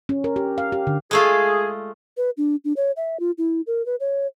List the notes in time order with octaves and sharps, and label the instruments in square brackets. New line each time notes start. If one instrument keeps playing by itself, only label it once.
[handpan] C#4
A#4
G4
F5
G4
D3
[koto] G#3 A3 F4 [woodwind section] G#4
[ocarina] B4
D4
D4
C#5
E5
F4
E4
A#4
B4
C#5